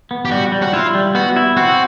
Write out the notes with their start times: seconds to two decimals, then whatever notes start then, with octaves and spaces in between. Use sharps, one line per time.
0.11 B3
0.25 G4
0.31 G3 F#4
0.52 G3
0.62 F#4
0.73 E4 F4
0.95 G3
1.15 B3 F#4
1.36 E4
1.57 C4 F#4